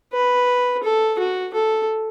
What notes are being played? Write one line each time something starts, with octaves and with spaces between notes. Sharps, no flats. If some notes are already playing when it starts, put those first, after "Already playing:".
B4
A4
F#4
A4